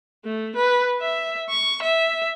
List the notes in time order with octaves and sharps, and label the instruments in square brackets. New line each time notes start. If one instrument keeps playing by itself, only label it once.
[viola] A3
B4
E5
C#6
E5